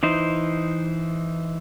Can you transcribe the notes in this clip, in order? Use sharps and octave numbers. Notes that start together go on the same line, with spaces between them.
E3 D#4 C5